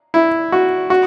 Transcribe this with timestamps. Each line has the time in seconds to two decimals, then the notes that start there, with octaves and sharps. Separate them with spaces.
0.14 E4
0.52 F#4
0.90 F#4